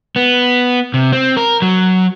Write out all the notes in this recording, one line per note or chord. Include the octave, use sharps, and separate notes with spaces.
B3
C3
C4
A#4
F#3